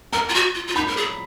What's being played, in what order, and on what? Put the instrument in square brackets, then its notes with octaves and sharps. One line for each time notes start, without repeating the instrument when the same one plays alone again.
[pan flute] A#4 [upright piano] A#5
[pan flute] F4
F#4
F4
F4
[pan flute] D#4 [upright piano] B5
[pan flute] A#4
G#4